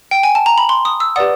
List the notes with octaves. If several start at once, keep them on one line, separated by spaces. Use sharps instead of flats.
G5
G#5
A5
A#5
B5
C6
D#6
E6
G4 B4 D5 F#5 D#6